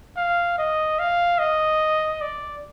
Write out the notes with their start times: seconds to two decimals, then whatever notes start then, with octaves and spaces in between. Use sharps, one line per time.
0.17 F5
0.58 D#5
0.99 F5
1.39 D#5
2.21 D5